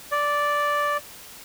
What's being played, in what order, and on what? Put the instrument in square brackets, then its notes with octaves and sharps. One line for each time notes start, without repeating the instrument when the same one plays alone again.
[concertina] D5